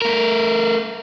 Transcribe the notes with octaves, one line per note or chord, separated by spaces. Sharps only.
A3 A#4